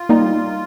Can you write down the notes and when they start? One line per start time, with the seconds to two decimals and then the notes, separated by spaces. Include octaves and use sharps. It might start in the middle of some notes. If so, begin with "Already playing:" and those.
Already playing: F4
0.09 G3 A#3 D#4